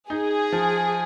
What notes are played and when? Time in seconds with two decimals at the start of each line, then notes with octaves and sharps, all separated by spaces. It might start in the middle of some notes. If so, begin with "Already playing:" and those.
0.10 D#4 G#4
0.52 F3